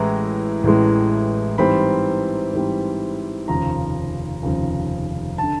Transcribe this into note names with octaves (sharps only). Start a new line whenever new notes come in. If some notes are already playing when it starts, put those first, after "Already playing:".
Already playing: A1 A2 E3 G#3 A#5
A1 A2 E3 G#3
G#2 E3 G3 C4 B5
G#2 E3 G3 C4
F1 D#2 C#3 F3 A#5
F1 D#2 C#3 F3
D3 A5